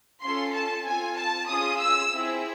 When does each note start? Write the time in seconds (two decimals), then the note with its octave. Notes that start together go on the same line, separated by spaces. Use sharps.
0.23 C#4 F4 A4 C6
0.54 A5
0.86 C4 F4 A4 G#5
1.17 A5
1.48 C#4 F4 G#4 D#6
1.80 E6
2.12 C4 E4 G#4